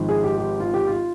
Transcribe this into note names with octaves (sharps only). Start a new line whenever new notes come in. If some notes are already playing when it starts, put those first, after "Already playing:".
Already playing: G#1 G#2 F3
G#4
G4
G4
F4
G4
F4